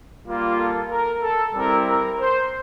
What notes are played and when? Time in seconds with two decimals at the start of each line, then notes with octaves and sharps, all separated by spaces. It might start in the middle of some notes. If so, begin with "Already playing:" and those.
0.25 G3 A#3 F4
0.57 A4
0.90 A#4
1.23 A4
1.55 G3 C4 E4 A#4
1.87 A#4
2.20 C5